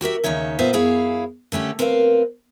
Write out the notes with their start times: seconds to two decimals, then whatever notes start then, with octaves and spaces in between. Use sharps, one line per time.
0.01 F#4 G4 A#4 E5
0.24 D#2 C#3 D#4 C#5 E5
0.59 A#2 B3 C5 E5 F5
0.73 F#2 E4 G#4 C#5 F5
1.52 D3 A3 C#4 G4
1.79 C4 A#4 B4 D#5 F5